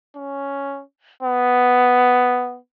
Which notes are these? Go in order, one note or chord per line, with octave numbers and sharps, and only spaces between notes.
C#4
B3